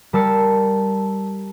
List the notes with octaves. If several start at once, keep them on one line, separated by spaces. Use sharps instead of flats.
G3 A#4 A5 E6 C7 C#7